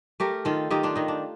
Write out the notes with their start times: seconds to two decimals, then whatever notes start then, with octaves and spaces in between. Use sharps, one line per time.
0.20 A3 G4 A#4
0.45 D#3 F4 A4
0.70 D#3 D#4 G4
0.83 D4 F4
0.96 D#3 D#4
1.08 D4